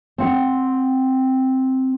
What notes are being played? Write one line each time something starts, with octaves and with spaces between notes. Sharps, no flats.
C4 F#5